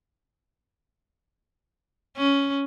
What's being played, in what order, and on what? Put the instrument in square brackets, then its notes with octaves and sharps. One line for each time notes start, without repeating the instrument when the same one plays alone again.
[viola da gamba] C#4